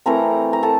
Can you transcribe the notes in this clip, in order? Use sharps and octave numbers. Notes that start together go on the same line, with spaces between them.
E3 A3 C4 A#4 A#5
A#5
A4 A5